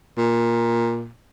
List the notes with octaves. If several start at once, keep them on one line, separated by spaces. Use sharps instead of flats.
A#2